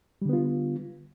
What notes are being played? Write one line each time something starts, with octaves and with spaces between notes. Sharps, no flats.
D3 G3 B3 F4